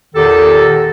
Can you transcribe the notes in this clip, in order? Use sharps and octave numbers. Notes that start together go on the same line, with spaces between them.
E2 A#2 D#3 G4 A4